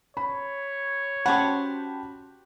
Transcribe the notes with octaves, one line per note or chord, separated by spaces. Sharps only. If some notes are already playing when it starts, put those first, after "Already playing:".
C#5 B5
C#4 F#4 G4 C5 F#5 G5 A5 B5